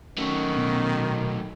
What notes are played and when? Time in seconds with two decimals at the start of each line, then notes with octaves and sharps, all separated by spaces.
0.18 D#3 F#3 A3 C#4
0.57 B2